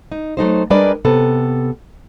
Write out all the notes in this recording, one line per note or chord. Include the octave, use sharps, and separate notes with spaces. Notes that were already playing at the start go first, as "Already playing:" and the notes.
D#4
F#3 A3 D#4 C5
G3 G#3 D4 A#4 B4 D5
C3 B3 A4